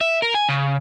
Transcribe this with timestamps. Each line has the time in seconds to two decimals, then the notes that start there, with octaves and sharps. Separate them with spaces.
0.01 E5
0.22 A#4
0.34 G#5
0.49 C#3